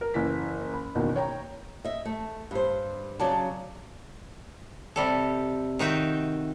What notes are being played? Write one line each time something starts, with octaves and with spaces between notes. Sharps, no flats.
A#4
F#1 E3 B6
B5
F#1 E2 B2 D#3
C#5 G5 A#5
D#5 E5
A3
G2 C5
C#3 F#3 D5 A5
C3 G3 A4
D#3 D#4 F#4 E5 G5